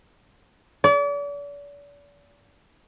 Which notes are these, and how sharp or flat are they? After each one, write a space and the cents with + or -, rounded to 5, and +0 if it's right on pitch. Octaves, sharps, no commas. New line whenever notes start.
D5 -40